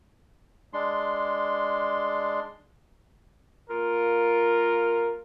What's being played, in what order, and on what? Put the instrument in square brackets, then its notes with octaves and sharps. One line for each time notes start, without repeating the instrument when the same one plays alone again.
[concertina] G#3 D4 C6
[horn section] A#3 F4 A#4